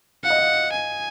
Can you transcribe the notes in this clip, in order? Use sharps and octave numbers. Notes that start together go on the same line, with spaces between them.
F5 F#5
D#5
F5
G#5